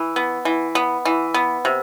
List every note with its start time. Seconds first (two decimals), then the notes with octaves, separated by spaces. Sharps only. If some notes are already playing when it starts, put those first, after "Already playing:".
Already playing: E3
0.16 B3
0.45 E3
0.75 B3
1.05 E3
1.34 B3
1.65 C3